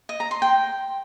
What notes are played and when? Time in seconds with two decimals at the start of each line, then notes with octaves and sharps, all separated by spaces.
0.09 D#5
0.20 A#5
0.31 C6
0.42 G5